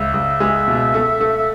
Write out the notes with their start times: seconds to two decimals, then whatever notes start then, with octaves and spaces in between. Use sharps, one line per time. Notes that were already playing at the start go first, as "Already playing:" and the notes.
Already playing: C#2 E5
0.14 C#2
0.40 G#3
0.68 B2
0.94 A3
1.21 A3
1.38 E5